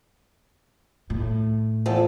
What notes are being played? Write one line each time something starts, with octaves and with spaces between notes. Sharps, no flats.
A2
E2 F3 A4